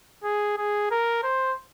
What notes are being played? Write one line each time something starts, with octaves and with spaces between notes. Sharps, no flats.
G#4
G#4
A#4
C5